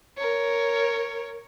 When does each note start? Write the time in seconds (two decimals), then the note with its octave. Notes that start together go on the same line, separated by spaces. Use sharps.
0.17 A#4 C#5